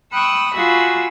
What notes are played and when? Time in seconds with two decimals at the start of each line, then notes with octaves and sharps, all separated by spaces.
0.12 G5 B5 C#6 D#6 E6 F#6
0.53 F4 F#4 G#4 B5 E6